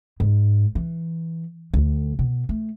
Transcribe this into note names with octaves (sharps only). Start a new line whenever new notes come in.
G#2
E3
D2
B2
A3